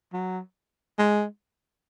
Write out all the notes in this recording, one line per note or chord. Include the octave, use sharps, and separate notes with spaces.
F#3
G#3